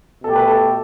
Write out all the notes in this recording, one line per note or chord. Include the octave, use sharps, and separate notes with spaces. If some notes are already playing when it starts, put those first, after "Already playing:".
B2 A3 G4 A4
B4
A4